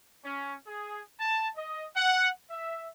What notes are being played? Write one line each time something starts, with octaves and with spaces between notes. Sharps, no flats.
C#4
G#4
A5
D#5
F#5
E5